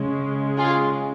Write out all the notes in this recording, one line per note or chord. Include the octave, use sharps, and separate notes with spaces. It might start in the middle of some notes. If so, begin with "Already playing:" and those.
Already playing: C#3 G#3
F4 G#4